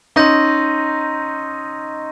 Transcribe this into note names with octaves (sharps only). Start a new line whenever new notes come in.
C#4 D#4 C6 E6 G6 A#6 D#7